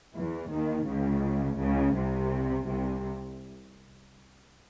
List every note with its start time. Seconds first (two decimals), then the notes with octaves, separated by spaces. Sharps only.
0.14 E2 E3
0.50 D#2 D#3
0.86 C#2 C#3
1.59 C#2 C#3
1.95 C2 C3
2.67 C2 C3